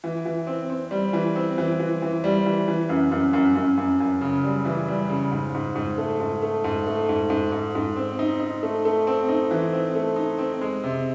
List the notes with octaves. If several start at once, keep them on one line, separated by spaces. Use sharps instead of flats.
E3
E3
C4
C4
G3
E3
C4
E3
E3
E3
G3
E3
E3
F#2
F#2
F#2
F#2
F#2
F#2
C#3
G3
E3
G3
C#3
G#2
G#2
G#2
A3
G#2
A3
G#2
A3
G#2
G#2
G#2
G#2
C4
D#4
D#4
A3
A3
C4
D#4
E3
C4
A3
D#4
C4
G#3
C3